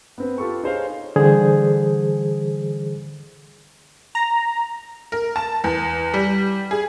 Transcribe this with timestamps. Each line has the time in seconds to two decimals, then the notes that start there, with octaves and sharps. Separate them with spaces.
0.18 B3 C4 B4
0.38 F4 G4 A4 B4 C#6
0.63 D#4 G#4 C5 C#5 F5
1.16 D3 E3 G3 G#4 C5
4.15 A#5
5.12 A#4
5.36 A5
5.64 E2
6.14 G3
6.71 G#4